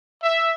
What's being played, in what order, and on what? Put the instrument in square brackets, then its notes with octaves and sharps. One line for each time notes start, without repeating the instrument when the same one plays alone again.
[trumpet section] E5